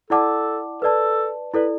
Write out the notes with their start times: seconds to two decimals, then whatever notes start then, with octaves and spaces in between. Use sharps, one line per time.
0.10 E4 A4 D5 F#5 A5 D6
0.82 A4 B4 D5 A5
1.54 E4 A4 B4 D5